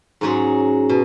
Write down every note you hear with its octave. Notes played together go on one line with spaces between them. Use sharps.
G#2 F#3 C#4 G#4 C#5
B2